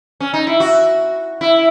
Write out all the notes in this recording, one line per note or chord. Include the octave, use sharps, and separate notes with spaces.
C#4
D#4
E4
F#4
E4